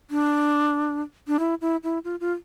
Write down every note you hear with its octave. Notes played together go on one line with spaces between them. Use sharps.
D4
D4
E4
E4
E4
F4
F4